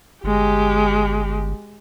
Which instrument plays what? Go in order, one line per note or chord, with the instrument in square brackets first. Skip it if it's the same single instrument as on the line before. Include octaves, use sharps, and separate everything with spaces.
[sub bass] G1 [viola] G#3 G4